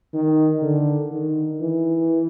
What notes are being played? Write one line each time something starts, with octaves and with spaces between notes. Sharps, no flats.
D#3
D3
D#3
E3